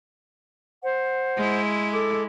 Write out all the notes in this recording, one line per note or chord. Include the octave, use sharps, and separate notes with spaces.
C5 F#5
G#3 E4
A4 D6